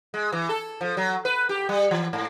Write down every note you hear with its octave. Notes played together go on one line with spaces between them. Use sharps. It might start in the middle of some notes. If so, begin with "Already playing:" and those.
G#3
E3
A4
F3
F#3
B4
G4
G3
E3
G#2